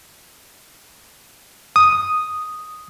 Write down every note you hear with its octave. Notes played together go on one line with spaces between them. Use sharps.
D#6